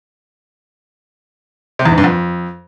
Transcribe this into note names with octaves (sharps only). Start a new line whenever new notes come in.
C3
E2
G#2
G2
F2